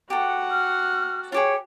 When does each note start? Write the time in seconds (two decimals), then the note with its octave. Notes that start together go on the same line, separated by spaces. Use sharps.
0.10 F#4 G4 A4 F#5
0.51 F6
1.32 F4 G4 G#4 C#5